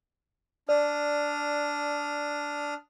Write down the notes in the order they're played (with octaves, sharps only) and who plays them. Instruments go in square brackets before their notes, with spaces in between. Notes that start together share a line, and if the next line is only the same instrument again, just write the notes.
[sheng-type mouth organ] D4 D#6 F6 [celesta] D5